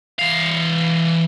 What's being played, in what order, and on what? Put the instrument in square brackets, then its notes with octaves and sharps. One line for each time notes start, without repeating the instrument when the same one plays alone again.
[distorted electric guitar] E3 F5